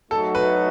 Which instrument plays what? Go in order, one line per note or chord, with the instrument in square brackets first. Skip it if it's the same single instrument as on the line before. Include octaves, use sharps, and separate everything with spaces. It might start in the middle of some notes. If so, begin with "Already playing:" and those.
[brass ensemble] F#3 A3 D#4 F#4 [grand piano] A4
[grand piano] B4